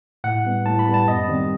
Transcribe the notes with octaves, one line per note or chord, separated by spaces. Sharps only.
A2 F#5
G3 B3
A2 A5
B5
G3 B3
A5
F#2 D#5
D#3 G3 C4